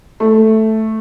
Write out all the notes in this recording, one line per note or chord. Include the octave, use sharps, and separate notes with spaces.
A3